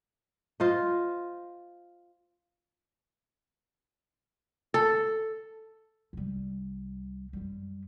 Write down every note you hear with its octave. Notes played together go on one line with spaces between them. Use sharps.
F4 C5 D#5
A4
C2 G3
F#2 G3